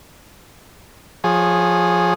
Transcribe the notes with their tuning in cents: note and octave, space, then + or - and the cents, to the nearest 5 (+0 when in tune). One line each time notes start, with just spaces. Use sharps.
F3 +15 G#4 +0 C#5 -5